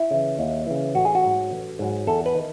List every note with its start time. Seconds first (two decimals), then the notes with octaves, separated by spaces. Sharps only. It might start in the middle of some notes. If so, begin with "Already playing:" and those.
Already playing: E4
0.11 C#3 E3
0.39 D#2
0.67 C#3 E3
0.95 A1 F#4
1.05 G#4
1.15 F#4
1.23 G#2 F#3
1.51 A1
1.79 G#2 F#3
2.07 E2 A4
2.26 B4
2.35 D#3